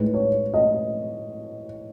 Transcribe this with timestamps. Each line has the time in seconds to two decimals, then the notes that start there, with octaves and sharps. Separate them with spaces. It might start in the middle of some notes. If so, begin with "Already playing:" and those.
Already playing: A2 G#3 D#4 B4
0.14 C#5
0.54 D#5